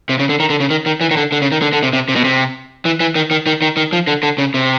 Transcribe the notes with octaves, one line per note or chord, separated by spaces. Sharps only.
C3
C#3
D3
D#3
D3
C#3
D#3
D#3
E3
D#3
D3
D3
C#3
D#3
D3
D3
C3
C3
C3
B2
C3
E3
E3
D#3
D#3
D#3
D#3
D#3
F3
D3
D3
C#3
C3